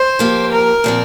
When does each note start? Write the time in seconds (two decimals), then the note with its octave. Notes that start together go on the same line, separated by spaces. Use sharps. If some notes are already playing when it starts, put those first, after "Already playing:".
Already playing: C5
0.19 F3 A#3 G4
0.52 A#4
0.84 A#2 F3 C4